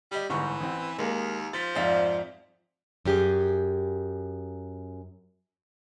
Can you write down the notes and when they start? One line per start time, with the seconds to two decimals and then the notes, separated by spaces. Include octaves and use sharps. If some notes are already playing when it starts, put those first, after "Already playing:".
0.11 G3 G4 D#5
0.30 G1 G#2 E3 C#6
0.60 A1 C4
0.98 D#2 G#3 A#3 D#4
1.53 F3 A6 B6
1.75 F2 G#2 D5 E5 F5
3.05 F#2 G4 G#4